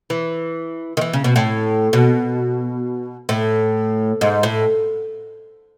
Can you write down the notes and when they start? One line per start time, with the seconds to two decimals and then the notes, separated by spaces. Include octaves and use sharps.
0.10 E3
0.97 D#3
1.01 E3
1.13 C#3
1.24 B2
1.36 A2
1.93 B2
3.29 A2
4.21 G#2
4.43 A2